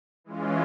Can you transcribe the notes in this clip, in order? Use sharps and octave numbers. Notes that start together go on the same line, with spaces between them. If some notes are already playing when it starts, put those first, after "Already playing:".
E3 G#3 C#4 F4